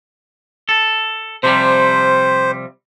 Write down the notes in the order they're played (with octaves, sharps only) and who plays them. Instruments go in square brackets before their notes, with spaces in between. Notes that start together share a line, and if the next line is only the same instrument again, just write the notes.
[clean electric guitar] A4
[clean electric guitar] C3 F3 G3 [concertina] C5